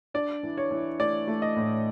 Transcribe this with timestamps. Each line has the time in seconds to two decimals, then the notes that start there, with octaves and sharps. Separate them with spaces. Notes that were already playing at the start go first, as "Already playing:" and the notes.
0.14 D4 D5
0.43 E3
0.58 C#5
0.71 E3
0.99 A3 D5
1.27 A3
1.42 D#5
1.56 A2